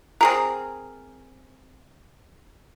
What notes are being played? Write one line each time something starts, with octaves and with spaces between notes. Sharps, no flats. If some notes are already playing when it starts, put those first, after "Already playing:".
C4 G#4 A#4